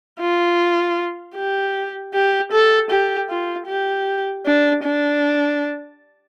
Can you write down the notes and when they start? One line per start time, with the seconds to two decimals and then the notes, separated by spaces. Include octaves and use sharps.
0.20 F4
1.36 G4
2.14 G4
2.51 A4
2.90 G4
3.30 F4
3.67 G4
4.46 D4
4.84 D4